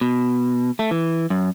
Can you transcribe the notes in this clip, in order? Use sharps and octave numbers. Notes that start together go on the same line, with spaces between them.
B2
A3
E3
F#2